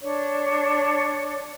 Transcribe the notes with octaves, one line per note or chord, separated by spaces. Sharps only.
D4 C#5